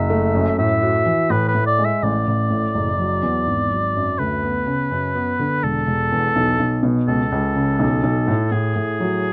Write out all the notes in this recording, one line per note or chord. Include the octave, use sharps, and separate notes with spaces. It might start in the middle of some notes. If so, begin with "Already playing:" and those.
Already playing: F#1 E5
A3
F#2
A2 E5
F#4
E3
A2 B4
B4
A2
D5
G#3
E5
A1 D5
A1
A2
F#1
F#3
E2
G#1
F#3
F#2
D2 B4
B3
C#3
F#2
B3
D3
E1 A4
E1
E2
B1
B1
B2
C#2 A4
C#2
C#3
B1
B1
A2
A2 G#4
A2
F#3